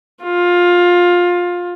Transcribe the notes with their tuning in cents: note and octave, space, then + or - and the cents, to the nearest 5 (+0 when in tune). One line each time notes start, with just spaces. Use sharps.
F4 +15